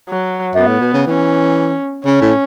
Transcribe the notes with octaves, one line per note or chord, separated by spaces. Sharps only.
F#3
F#2 B3
A2
B2
C#3
E3 C#4
C#3 C#4
A2